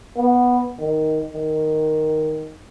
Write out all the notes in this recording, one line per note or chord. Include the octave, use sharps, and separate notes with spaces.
B3
D#3
D#3